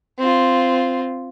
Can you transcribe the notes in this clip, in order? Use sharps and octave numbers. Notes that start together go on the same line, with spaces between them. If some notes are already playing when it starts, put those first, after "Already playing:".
C4 F4